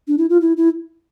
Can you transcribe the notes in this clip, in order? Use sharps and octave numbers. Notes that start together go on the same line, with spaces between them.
D4
E4
F4
E4
E4